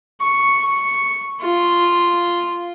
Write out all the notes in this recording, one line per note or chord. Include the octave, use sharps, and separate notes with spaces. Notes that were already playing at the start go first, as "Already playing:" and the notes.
C#6
F4